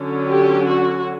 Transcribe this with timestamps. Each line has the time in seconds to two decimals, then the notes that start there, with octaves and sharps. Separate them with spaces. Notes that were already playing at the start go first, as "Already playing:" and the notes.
Already playing: D3 F#3 C#4
0.28 G4
0.67 F#4